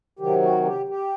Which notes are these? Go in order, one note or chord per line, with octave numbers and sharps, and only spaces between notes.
C3 D#3 F#3 G4
F#4
G4
G4